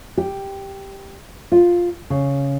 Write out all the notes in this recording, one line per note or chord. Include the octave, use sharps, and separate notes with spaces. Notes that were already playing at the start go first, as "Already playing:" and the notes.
G4
F4
C#3